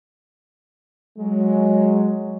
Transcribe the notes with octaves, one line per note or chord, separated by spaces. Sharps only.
F#3 G#3